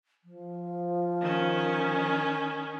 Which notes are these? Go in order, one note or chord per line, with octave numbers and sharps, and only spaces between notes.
F3
D#3 C#4